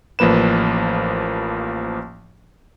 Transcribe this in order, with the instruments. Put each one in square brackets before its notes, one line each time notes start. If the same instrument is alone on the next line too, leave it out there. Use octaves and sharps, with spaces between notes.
[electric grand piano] A1 F3 A#3 B4 E7